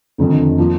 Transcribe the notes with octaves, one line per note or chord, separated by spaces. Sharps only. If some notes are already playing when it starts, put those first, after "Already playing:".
F1 F2 D3 D#3
F3 A#3 D4